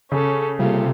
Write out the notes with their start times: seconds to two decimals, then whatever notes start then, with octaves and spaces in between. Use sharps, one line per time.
0.12 C#3 C#4 A4
0.59 C3 G3 A#3 F4 A4